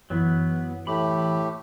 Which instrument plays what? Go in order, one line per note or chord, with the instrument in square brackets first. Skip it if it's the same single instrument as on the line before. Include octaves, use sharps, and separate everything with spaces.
[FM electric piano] F#2 E3 [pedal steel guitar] F#3 B3
[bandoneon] A2 A3 G4 [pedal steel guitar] B5